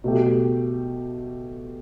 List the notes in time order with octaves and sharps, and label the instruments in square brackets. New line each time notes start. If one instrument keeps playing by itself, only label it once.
[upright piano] B2 A3 G4